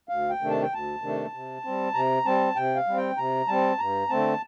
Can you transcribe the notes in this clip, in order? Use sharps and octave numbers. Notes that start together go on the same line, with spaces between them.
D2 F5
G5
C3 D#3 A3 D4
A5
G5
D2 A5
C3 D#3 A3 D4
C3
G3 C4
C3 A#5
G3 C4 A5
C3 G5
F5
G3 C4
G5
C3 A#5
G3 C4 A5
G2 A#5
D3 A3 C4 A5